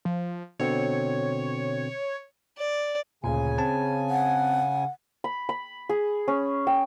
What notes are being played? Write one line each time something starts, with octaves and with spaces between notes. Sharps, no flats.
F3
B2 D3 C4 C#5
D5
D2 A#2 C#3 G#5
C4 A5
F#5
B5
B5
G#4
C#4
G5